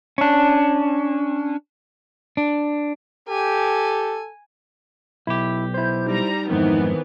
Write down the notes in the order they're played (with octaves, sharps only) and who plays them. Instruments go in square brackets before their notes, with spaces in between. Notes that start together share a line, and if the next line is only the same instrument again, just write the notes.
[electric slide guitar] C#4 D4
[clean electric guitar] D4
[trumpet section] G4 [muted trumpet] A4 [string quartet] G#5
[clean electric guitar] B1 G4 [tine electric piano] E4
[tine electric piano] E4 C5 [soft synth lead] G6
[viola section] G3 A#5 [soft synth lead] D#4
[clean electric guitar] F2 G#2 [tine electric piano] D#3 C5 [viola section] E3 B3